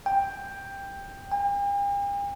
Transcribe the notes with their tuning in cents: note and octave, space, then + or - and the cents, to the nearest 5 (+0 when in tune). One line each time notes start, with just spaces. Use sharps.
G5 +10
G5 +45